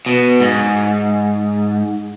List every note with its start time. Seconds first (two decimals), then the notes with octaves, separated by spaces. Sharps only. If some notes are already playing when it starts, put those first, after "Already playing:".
0.06 B2
0.40 G#2